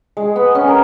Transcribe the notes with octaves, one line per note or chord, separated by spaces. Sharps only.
G#3
B3
C#4
A#4